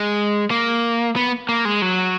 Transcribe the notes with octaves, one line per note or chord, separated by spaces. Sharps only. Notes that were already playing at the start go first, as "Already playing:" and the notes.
Already playing: G#3
A#3
B3
A#3
G#3
F#3